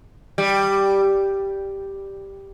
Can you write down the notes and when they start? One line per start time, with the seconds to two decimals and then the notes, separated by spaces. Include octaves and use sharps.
0.38 G3